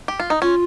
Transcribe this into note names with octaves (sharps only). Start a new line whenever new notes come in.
G4
F4
D#4
C#4 F4